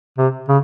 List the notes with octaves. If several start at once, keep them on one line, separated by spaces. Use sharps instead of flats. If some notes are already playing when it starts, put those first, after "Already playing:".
C3
C#3